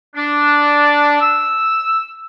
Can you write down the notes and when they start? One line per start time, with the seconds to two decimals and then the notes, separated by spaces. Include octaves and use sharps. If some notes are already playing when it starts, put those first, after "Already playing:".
0.16 D4
1.21 E6